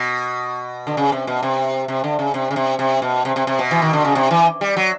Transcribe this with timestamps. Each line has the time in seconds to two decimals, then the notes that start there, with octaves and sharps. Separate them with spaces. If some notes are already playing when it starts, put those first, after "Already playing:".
Already playing: B2
0.87 D3
0.97 C#3
1.12 C3
1.27 B2
1.43 C3
1.88 C3
2.04 D3
2.19 C#3
2.34 C3
2.51 C#3
2.56 C3
2.79 C3
3.02 B2
3.25 C3
3.36 C3
3.47 C3
3.59 B2
3.71 E3
3.82 D#3
3.93 D3
4.05 C#3
4.15 C3
4.31 E3
4.61 G3
4.77 F#3